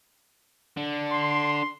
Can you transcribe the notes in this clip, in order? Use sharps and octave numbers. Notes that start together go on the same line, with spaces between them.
D3
C6